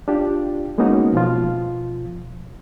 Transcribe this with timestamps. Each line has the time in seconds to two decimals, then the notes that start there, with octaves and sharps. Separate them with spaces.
0.08 D4 F4 G4
0.78 G#3 A#3 B3 C#4 D#4 F#4
1.12 B2 F3 F4